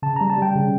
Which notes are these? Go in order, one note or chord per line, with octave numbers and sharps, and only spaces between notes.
C#3 A5
A#5
G3
A5
G3 G5
C#3